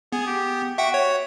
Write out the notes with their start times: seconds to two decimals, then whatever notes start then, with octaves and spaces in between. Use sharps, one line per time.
0.12 B3 G#4
0.27 G4
0.78 F#4 E5 F#5 G5
0.94 C#5